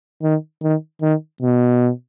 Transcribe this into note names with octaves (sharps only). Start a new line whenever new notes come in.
D#3
D#3
D#3
B2